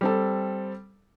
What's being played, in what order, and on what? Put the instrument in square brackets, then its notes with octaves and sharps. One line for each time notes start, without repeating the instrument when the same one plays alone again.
[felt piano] G3 C4 A4